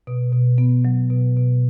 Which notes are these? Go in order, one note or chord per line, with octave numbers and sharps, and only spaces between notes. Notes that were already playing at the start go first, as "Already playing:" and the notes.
B2
B2
B3
F#3
B2
B2